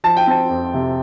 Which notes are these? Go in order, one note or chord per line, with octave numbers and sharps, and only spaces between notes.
F3 A5
G5
C4 A5
F2
C3